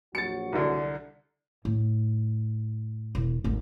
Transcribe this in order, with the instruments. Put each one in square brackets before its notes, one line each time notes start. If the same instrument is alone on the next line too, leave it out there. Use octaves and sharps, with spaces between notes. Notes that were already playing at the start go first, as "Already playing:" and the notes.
[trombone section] A#1 F#3 F#4 [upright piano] A6 C#7
[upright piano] C2 D3
[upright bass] A2
E1
G#1 D2